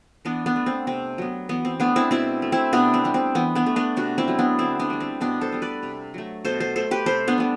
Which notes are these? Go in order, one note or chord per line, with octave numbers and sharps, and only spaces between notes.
E3 B3 D4
B3 D4
A3
C4
C3 C4
F#3 B3
E3 B3
C4
A3 B3 D4
C4 E4
B2 C4 E4
A3
C4 E4
C3 B3 D4
C4
G3 B3
C4
E3 B3
B3 D4
A3
B3 D4
C3 D4 F#4
C4 E4
F#3 A3
B3 D4
D3 C4 E4
B3 D4
G3 B3
C4
B2 B3 D4
A4 C5
G3 B3
B4 D5
C3
F#3 A3
B2 A4 C5
A4 C5
A3 A4 C5
G4 B4
C3 A4 C5
B3 D4
G3 B3